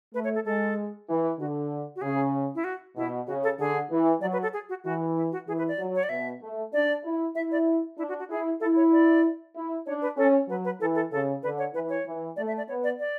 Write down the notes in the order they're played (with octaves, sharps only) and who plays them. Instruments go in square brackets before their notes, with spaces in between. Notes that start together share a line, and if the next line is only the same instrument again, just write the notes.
[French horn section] A3 [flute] B4
[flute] C#5
A4
[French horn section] G#3 [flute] A4
[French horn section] E3
[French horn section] D3 [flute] F#4
[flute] F#4
[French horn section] C#3 [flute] G#4
[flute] E4
F#4
[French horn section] B2 [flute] E4
[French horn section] C#3 [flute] F#4
[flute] A4
[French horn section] D3 [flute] G#4
[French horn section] E3
[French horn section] F#3 [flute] D5
[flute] B4
A4
G#4
F#4
[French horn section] E3 [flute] F#4
[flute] E4
F#4
[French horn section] E3 [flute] G#4
[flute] B4
D5
[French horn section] F#3
[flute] C#5
D5
[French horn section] B2 [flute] E5
[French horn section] A3
[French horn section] D4 [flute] D5
[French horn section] E4
[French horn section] E4 [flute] E5
[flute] D5
[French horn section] D4 [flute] E4
[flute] F#4
F#4
[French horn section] E4 [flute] G#4
[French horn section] E4 [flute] A4
[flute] C#5
D5
[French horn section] E4
[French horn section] D4 [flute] C#5
[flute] B4
[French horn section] C#4 [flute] A4
[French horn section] F#3 [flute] B4
[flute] B4
[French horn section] E3 [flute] A4
[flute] A4
[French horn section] C#3 [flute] A4
[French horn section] D3 [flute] B4
[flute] C#5
[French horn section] E3 [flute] B4
[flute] C#5
[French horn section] E3
[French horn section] A3 [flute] D5
[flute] E5
D5
[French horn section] B3 [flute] C#5
[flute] D5
D5